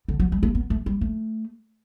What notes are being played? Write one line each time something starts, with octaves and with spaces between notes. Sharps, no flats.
D3
F#3
G3
A3
B3
A3
G3
A3